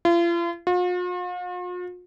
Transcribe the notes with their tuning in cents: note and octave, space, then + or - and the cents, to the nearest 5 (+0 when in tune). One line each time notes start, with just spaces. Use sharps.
F4 -40
F4 +45